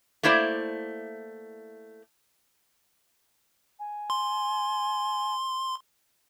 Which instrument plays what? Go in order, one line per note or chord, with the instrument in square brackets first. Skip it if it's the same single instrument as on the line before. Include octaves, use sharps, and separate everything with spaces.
[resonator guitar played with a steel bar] A3 A#3 E4 C5 D5
[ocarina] G#5
[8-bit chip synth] C6